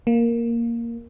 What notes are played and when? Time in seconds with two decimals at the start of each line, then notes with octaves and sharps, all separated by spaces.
0.07 A#3